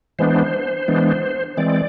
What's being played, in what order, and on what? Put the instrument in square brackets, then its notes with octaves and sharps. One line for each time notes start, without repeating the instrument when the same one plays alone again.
[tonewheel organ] E3 G#3 B3 D4 C5
E3 G#3 B3 D4
E3 G#3 C4 D5